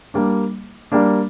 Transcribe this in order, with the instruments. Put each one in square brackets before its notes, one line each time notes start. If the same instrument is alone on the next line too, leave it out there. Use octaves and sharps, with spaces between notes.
[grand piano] G3 A#3 D4
G3 A#3 D4